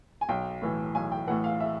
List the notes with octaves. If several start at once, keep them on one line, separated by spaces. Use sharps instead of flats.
G#5
B1 G5
A2 E3
B1 G#5
G5
A2 E3 F#5
F5
E5